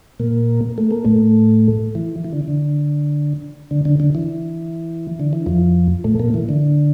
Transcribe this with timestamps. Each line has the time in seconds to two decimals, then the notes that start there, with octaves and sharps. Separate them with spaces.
0.20 A#2 A#3
0.78 A3
0.91 A#3
1.05 A2 A3
1.95 E3
2.24 E3
2.33 D3
2.48 D3
3.71 D3
3.85 D3
4.00 D3
4.15 E3
5.20 D3
5.33 E3
5.46 F2 F3
6.04 A2 A3
6.20 A#2 A#3
6.34 E3
6.49 D3